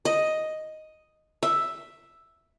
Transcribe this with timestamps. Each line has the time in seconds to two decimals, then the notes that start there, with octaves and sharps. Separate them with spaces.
0.05 D#5
1.43 E5